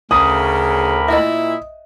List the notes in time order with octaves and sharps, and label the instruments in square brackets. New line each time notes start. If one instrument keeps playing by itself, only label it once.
[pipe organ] D2 A#4 B5 [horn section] C#3 [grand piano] D#6
[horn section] A#2 E4 [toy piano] D#5 E5